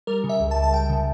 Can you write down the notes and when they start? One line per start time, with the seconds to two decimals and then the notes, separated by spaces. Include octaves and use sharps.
0.07 G3 A#4
0.24 C#3
0.29 E5
0.40 C#2
0.51 A5
0.56 C#2
0.63 A5
0.73 C#2 G5
0.89 C#3